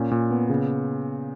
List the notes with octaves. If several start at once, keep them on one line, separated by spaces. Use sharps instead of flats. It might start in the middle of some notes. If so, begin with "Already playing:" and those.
Already playing: A#2 C#4
A#2
B3
C#3